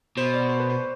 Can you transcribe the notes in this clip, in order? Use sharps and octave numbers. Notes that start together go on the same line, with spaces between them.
B2 C5
D5
C5
B4
C5